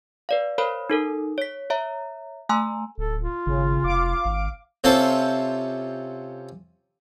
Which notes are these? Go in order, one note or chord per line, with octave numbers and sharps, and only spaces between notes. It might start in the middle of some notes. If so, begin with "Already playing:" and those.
B4 D5 F5
A#4 C5 C#5 F5 B5
D#4 A4 A#4
C#5 B6
C#5 E5 A#5
A3 G#5 A#5 C6 E6
D1 A4
F4
G#1 C#3
F1 F5 D6
G#1
C3 C#4 F4 A4 C5 A5